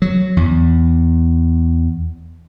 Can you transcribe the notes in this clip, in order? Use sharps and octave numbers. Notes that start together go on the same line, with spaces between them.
F#3
E2